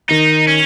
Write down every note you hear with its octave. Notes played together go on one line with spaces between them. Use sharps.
D#3 D#4
C#4